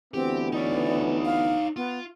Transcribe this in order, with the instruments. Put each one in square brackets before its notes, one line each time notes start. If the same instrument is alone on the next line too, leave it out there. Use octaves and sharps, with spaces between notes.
[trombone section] D2 E3 B3 [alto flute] C4 [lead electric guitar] G4
[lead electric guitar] D#4 C#5 [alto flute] D5
[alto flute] F5
[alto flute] B3 [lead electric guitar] F4